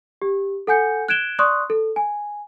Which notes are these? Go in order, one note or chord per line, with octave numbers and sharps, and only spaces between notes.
G4
A4 F#5 G#5 G6 C#7
F#6 G#6 D7 E7 G7
D5 C6 C#6 D#6 F#6
A4
G#5